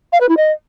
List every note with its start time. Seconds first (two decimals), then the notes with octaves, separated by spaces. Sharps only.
0.13 F5
0.21 B4
0.29 E4
0.37 D#5